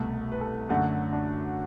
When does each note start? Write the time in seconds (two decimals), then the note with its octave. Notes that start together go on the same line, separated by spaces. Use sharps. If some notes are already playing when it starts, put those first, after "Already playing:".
Already playing: C2 B2 A3
0.32 B4
0.41 A4
0.69 F#2 D3 F#3 A3 F#4
1.13 D4